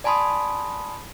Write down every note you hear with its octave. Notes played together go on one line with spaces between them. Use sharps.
D5 G#5 A5 B5 C6 D#6